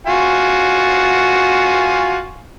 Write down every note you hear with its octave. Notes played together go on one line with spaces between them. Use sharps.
F4 F#4 G#5